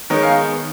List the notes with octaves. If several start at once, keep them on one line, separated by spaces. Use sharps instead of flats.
D#3 G#3 B3 D#4 A#4 C#5
F5 G#5